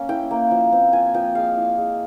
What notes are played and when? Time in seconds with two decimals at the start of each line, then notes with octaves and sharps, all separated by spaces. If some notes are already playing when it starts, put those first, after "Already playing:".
Already playing: A#3 C#4
0.09 E4 G5
0.31 A#3
0.51 F3
0.72 C4
0.93 F4 G#5
1.14 F3 G5
1.35 G#3 F5
1.57 E4
1.78 G#3